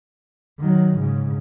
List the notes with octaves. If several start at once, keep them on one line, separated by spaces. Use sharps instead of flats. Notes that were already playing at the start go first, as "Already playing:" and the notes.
D#3 F#3
G#2 C#3